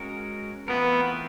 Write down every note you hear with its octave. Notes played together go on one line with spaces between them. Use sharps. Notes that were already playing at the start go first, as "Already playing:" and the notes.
Already playing: G#3 C#4 F#4 A#4
E3 A3 B3 C4 F4 A#4